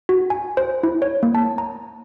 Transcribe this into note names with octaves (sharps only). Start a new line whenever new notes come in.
F#4
G#5
C5
E4
C#5
A#3
A5
A#5